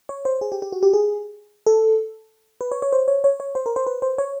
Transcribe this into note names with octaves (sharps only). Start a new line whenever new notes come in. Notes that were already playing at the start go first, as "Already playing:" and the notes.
C#5
C5
G#4
G4
G4
F#4
G4
G#4
A4
B4
C#5
C#5
C5
C#5
C#5
C#5
C5
A#4
C5
B4
C5
C#5